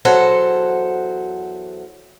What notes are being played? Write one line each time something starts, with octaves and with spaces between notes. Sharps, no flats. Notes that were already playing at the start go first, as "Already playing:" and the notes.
E2 F#3 A4 C5 F#5